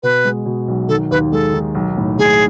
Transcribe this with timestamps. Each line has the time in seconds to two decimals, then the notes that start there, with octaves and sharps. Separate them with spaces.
0.03 B2 B4
0.25 G#3
0.46 B2
0.68 B1
0.89 D#3 A4
1.11 D#2 B4
1.32 G#3 A4
1.53 D#3
1.75 B1
1.97 A2
2.19 A2 G#4